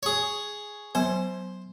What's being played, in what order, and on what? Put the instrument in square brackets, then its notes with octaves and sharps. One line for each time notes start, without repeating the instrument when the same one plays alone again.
[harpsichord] G#4 C#5
[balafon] F#3 B3 [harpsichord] C5